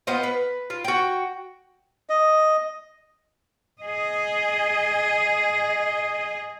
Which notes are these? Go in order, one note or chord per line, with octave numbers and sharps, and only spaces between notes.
B3 F4 C5 D#5
B4
F4
F#4 G5
D#5
G#4 D#5